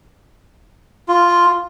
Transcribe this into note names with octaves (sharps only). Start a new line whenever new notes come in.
F4